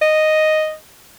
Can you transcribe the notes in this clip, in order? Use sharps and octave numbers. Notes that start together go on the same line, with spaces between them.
D#5